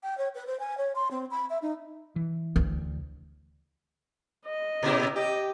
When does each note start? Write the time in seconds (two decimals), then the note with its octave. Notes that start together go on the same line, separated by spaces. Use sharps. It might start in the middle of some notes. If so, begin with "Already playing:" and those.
0.03 G5
0.18 C#5
0.35 B4
0.47 C5
0.59 G#5
0.77 C#5
0.95 C6
1.11 C4
1.31 B5
1.50 E5
1.62 D#4
2.16 E3
2.56 D2
4.45 D#5
4.83 A#2 C#3 E4
5.16 G4 D#5